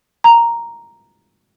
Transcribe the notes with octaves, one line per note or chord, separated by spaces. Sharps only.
A#5